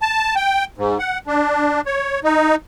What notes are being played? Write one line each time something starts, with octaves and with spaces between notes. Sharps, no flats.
A5
G5
G#2
F#5
D4
C#5
D#4